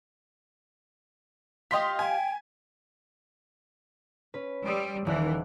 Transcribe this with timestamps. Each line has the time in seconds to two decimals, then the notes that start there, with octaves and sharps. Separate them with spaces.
1.71 F4 G4 D#5 F5 C6 B6
1.99 G5 G#5
4.34 C#4 B4
4.65 G3 C6 D#6 E6
5.07 D#1 D#3 E3 D5 F#6